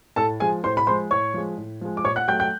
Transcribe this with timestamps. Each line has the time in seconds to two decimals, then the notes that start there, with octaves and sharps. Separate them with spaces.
0.16 A2 A4 A5
0.40 F3 G#3 G#4 G#5
0.64 A2 C5 C6
0.77 B5
0.87 F3 G#3 C5 C6
1.10 A2 C#5 C#6
1.34 F3 G#3
1.57 A2
1.81 F3 G#3
1.97 D6
2.04 A#2 C#5 C#6
2.16 F#5 F#6
2.28 F#3 A3 G5 G6
2.40 G5 G6